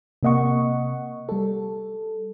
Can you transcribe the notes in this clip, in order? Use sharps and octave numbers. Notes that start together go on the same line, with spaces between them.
C3 A#3 D#5 F#5 C#6
G3 A4